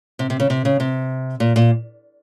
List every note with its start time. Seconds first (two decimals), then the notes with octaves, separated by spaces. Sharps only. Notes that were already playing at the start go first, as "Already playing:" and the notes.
0.19 C3
0.30 C3
0.40 C#3
0.50 C3
0.65 C#3
0.80 C3
1.40 A#2
1.56 A#2